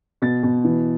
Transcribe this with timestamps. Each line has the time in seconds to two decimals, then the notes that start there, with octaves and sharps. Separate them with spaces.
0.22 B2 A6
0.43 B2
0.64 E3